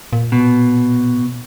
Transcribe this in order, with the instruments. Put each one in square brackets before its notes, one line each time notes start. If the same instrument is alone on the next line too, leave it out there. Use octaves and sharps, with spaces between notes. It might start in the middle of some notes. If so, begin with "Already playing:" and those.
[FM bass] A#2
[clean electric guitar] B2